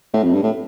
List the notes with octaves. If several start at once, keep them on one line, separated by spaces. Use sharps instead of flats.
A2
F2
G2
A2